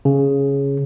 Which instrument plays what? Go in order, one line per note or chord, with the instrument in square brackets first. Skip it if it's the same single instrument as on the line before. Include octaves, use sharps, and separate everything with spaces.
[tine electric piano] C#3